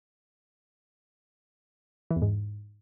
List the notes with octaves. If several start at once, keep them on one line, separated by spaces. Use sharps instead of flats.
E3
E2
G#2